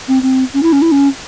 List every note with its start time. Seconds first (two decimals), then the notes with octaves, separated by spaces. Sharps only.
0.08 C4
0.23 C4
0.54 C#4
0.63 E4
0.73 C#4
0.82 E4
0.92 C#4